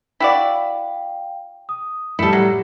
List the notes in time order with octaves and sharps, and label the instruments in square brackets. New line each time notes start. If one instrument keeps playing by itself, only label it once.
[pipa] E4 F#4 D5 [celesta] F5 G5
[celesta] D#6
[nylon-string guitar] A2 G3 [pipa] E4 A4 [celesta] C#7
[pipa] F#3